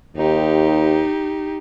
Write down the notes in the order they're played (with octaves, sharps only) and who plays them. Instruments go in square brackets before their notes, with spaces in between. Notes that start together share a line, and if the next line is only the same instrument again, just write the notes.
[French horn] D#2 [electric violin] D#4 G4